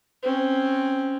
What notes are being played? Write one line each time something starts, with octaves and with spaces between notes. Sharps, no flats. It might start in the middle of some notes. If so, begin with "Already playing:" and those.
C4 C#4